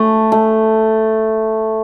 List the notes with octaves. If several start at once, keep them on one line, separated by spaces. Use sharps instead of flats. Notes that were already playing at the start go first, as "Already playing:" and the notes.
Already playing: A3
A3